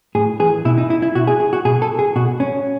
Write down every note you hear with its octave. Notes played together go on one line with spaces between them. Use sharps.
A2 G#4
E3 G#4
B2 E4
D#4
E4
E4
B2 F#4
G#4
G#4
F#4
B2 G#4
A4
G#4
B2 F#4
C#4